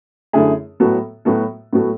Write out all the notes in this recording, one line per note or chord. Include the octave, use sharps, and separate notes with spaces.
F#2 D3 A3 E4 G#4
A2 F#3 B3 F#4 A4
A2 F#3 B3 F#4 A4
A2 F#3 B3 F#4 A4